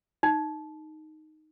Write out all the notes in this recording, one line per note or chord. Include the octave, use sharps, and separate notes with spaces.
D#4